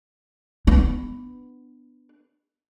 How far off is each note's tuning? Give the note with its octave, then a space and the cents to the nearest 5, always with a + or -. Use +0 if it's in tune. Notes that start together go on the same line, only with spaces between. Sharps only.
B3 +10 D4 +15